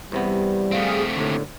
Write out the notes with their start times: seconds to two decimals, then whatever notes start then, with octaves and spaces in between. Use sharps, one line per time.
0.12 E2 C3 G3 B3
0.71 A3 C4 G#4 F5 D#6
1.17 D#2 A2 D3